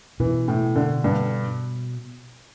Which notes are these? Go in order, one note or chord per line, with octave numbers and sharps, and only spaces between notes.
B2 E3
A2
D3
G2